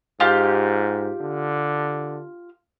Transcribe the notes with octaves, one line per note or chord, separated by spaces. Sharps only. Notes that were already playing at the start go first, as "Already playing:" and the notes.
G#2 F4 G4
D3